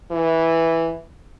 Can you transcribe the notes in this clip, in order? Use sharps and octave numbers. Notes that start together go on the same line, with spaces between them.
E3